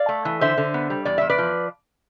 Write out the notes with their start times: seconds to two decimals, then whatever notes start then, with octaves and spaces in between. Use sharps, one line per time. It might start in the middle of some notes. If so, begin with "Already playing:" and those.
Already playing: D5 F5
0.09 A3
0.25 E3
0.41 D3 C5 E5
0.57 D3
0.74 B3
0.90 G3
1.05 E2 D5
1.18 E2 E5
1.30 B4 D5
1.38 F3